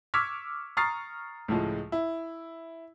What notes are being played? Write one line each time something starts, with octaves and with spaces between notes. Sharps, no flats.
C#6 D6 E6 F6 G#6 B6
A#5 C#6 D#6 F6 A6 C7
C#2 A2 F3 G#3
E4